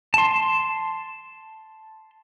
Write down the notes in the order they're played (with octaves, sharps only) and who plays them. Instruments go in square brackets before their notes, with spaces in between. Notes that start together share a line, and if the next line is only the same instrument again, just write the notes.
[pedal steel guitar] A5 C6